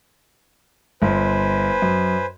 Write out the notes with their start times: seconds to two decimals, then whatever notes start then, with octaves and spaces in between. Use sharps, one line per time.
1.02 G1 B4 C5 G#5
1.82 F#2